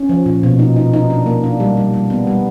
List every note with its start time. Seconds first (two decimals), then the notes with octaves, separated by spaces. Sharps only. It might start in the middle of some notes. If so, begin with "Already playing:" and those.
Already playing: C#4
0.09 F3
0.26 A#2
0.43 B2
0.59 D#4
0.76 D#4
0.94 D#4
1.10 D4
1.26 A#3
1.44 D4
1.60 G3
1.77 G3
1.94 G3
2.10 B3
2.27 G3